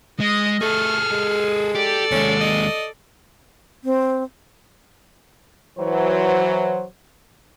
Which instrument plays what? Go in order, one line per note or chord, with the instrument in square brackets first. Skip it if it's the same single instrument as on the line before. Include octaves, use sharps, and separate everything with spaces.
[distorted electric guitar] G#3 [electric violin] D#5 D#6
[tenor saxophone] A3 [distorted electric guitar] G#4 A4 [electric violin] F6
[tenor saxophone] G#3
[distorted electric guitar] G4 [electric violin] A4 D5
[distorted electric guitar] D#2 G#3 [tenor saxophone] C#4
[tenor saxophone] D#5
[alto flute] C4
[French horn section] E3 F#3 C5